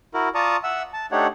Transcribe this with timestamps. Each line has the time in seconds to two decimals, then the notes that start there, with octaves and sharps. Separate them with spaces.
0.14 E4 F#4 A#4
0.35 F4 D5 A5 A#5 C#6 D#6
0.64 E5 F#5 E6
0.93 A5
1.12 A3 D4 D#4 G4 C#5 F#5